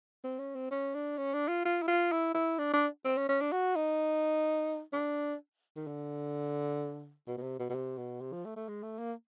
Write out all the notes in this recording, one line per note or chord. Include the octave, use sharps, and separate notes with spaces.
C4
C#4
C4
C#4
D4
C#4
D4
F4
F4
E4
F4
E4
E4
D4
D4
C4
C#4
C#4
D4
F#4
D#4
D4
D#3
D3
B2
B2
C3
B2
B2
C3
B2
C3
F3
A3
A3
G#3
A3
A#3